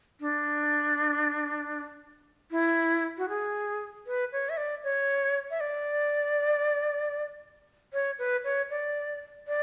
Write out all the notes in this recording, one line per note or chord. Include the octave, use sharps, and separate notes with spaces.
D4
E4
F#4
G#4
B4
C#5
E5
D5
C#5
E5
D5
C#5
B4
C#5
D5
D5